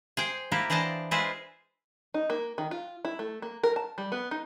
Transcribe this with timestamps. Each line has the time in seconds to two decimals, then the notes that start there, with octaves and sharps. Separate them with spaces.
0.17 G#4 C5 G5
0.52 A#3 E4 G4
0.70 E3 D4 C5 D#5 A5
1.11 G#3 F4 G#4 B4 C5 E5
2.14 D#4
2.30 A#3
2.58 D#3
2.71 F4
3.05 E4
3.19 A3
3.42 A#3
3.63 A#4
3.76 A5
3.98 G3
4.12 B3
4.31 D#4